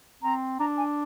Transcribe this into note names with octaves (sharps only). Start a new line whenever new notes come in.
C4 A#5
D4 A#5
G#5